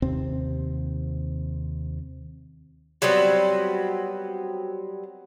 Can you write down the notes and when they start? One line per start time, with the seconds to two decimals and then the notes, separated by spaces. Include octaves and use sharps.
0.02 D#2 C3 C4
3.02 F#3 G3 B3 C4